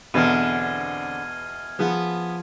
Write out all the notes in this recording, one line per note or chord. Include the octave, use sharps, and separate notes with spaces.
E2 B2 D3 C4 F6 G#6 D#7
F3 B3 G#4